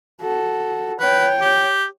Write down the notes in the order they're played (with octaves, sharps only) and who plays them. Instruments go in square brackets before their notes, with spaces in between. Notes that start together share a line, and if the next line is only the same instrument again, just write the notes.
[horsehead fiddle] F#4 A4
[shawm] B4 [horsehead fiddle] C#5 G5
[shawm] G4